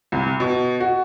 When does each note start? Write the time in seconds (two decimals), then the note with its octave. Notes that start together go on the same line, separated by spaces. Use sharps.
0.12 C2
0.40 B2
0.80 F#4